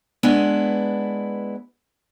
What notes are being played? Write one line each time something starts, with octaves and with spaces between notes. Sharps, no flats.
G#3 B3 D4 E4 B4